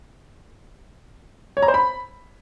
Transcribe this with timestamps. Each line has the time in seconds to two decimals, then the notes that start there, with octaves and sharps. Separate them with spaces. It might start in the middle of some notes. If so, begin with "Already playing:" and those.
1.57 C#5
1.62 A#5
1.68 C5
1.74 B5